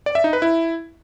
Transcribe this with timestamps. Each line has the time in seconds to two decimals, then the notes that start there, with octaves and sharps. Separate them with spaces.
0.06 D5
0.15 E5
0.24 D#4
0.33 B4
0.42 E4